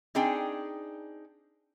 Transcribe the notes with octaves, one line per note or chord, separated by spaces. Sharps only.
C4 D4 D#4 G#4 D5 G5